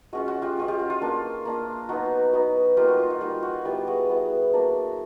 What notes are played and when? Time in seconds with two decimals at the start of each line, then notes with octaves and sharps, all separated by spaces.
0.13 G#3 C#4 F4 F#4
0.28 F#4
0.42 F4 G4
0.57 G#3 C#4 F4
0.68 F4 G4
0.79 F#4
0.90 F4
1.01 A#3 D4 F4
1.45 A#3 D4 F4
1.89 F#3 B3 D#4 F#4
2.33 F#3 B3 D#4
2.77 G3 A#3 D#4 F4 G4
2.88 F#4
2.99 F4
3.10 F#4
3.21 G3 A#3 D#4 F4
3.43 F#4
3.65 G3 B3 E4 F4 G4
3.87 F#4 G#4
4.09 G3 B3 E4
4.53 F#3 A#3 D4